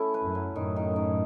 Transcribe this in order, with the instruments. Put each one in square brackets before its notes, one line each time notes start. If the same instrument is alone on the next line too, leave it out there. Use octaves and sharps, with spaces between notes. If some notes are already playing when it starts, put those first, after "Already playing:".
Already playing: [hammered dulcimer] A3 C#4 E4
B4
[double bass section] F#2
[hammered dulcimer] F#3
[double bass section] F#2 A2 [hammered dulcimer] D#3
[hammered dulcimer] D#3
D#3